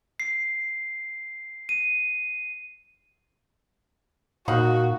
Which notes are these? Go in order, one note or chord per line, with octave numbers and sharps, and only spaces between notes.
C7
D#7
A#2 D#4 F#4 F5 F#5